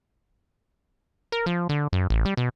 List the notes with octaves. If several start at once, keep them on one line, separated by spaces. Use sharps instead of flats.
A#4
F3
D3
F#2
A1
G3
B2